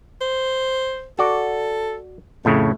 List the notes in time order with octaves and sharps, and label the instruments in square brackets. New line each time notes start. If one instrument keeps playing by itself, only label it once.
[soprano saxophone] C5
[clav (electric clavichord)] F#4 D5 [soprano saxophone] A4
[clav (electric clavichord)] F2 A2 C#3 [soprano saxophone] A3